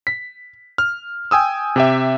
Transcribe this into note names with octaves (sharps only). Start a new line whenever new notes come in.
B6
F6
G5 G#5 D#6 E6
C3 G4 E5